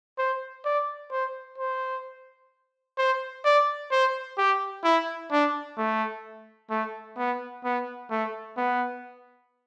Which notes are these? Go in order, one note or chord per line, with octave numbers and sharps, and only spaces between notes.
C5
D5
C5
C5
C5
D5
C5
G4
E4
D4
A3
A3
B3
B3
A3
B3